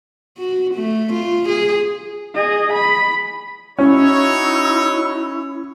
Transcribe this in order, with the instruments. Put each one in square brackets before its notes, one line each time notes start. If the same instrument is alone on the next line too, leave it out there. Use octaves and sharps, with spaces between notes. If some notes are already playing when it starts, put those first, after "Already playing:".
[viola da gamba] F#4
A3
F4
G#4
[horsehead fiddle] G#4 D#5
B5
[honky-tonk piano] C#4 [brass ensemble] D#4 F#4 C#5 [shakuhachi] E4